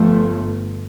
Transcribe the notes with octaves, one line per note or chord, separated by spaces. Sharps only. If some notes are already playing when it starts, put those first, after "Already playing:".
Already playing: G1 G2 F3 A3